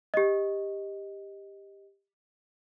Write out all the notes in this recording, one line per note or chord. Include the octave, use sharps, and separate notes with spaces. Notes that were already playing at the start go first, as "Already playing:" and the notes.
G4 D#5